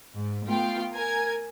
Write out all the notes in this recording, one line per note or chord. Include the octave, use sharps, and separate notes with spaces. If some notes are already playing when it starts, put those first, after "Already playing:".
G#2
A3 B3 F4 F5 G5
A#4 G#5 G#6